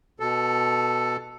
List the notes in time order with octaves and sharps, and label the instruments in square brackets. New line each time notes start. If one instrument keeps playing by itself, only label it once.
[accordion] B2 A4